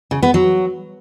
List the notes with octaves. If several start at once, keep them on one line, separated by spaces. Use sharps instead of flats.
C#3
B3
F#3